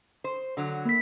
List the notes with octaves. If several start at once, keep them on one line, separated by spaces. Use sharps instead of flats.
C5
D3 F#3
A#3 B6